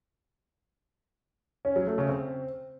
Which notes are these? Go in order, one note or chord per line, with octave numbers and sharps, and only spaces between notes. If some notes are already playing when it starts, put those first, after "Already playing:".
C#4
F#3
A3
C#3
C4